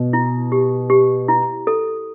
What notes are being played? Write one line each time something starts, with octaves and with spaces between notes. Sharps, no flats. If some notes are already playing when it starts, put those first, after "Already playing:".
Already playing: B2
E4
G4
G4
E4
A4